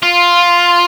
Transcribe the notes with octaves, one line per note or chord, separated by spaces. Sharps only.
F4